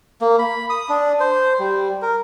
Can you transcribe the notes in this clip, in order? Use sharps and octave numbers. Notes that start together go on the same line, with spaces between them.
A#3
B5
D#6
D4
C5
G3
A#4